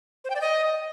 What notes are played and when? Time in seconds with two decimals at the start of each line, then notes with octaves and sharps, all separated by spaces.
0.24 C5
0.30 G5
0.35 D5
0.41 D#5